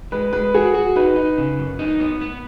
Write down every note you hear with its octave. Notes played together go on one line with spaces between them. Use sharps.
G#3 B4
G#3 B4
F#4 G#4
F#4
D#4 B4
D#4
C#3
F#2
D#4
B3
B3